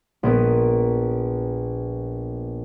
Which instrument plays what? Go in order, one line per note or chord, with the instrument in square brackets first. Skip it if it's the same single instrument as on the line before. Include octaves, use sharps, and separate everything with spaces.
[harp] A#1 B3 A#4